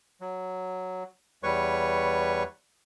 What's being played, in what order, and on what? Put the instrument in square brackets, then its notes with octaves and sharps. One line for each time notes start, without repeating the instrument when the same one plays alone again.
[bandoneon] F#3
E2 G3 B4 C#5 C#6